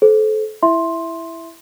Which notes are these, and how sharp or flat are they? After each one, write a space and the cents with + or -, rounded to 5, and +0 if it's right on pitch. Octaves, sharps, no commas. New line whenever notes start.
A4 -30 C5 +0
E4 +5 E5 +0 C6 +5